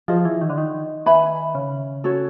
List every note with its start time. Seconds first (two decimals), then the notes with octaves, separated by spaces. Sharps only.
0.08 F3 F4 G#4 C5 D#5
0.25 E3
0.41 D#3
0.50 D3
0.58 D#3
1.06 B4 E5 G#5 B5
1.55 C#3
2.04 C#4 F#4 A4 C#5